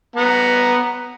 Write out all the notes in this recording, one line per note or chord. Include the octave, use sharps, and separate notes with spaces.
B3 F#5 A#5